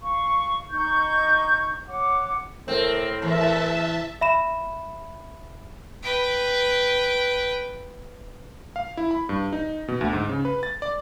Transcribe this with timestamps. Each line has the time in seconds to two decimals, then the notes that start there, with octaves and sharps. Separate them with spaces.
0.01 F5 C#6
0.70 D#4 C#6 G6
1.89 C#5 F#5 D6
2.68 A2 C4 A#4
3.22 E2 E5 A5
4.21 E5 B5 E7
6.02 B4 G5
8.76 F5
8.97 E4
9.11 B5
9.29 G2
9.53 D#4
9.88 B2
10.01 D2
10.13 G#2
10.29 C#3
10.45 B4
10.63 A6
10.82 D5